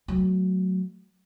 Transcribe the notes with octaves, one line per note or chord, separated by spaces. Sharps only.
F#3 A3